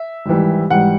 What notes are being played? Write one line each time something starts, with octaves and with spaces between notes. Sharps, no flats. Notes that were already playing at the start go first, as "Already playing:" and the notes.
Already playing: E5
G#1 G#2 E3 G3
G#1 G#2 E3 G3 F#5